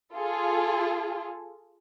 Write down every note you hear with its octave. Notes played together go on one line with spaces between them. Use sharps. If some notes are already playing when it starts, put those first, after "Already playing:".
F4 G#4 A4